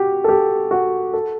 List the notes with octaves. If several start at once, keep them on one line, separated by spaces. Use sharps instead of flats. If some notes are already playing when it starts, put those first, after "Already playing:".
Already playing: F#4 G4
A4
G4
F#4
A4